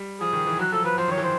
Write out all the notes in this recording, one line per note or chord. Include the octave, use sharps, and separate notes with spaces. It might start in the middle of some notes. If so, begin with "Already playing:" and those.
Already playing: G3
F3 G#4
D#3
E3
F#3 F#4
F3 A4
F3 B4
F3 C5
D#3 C#5
E3
C5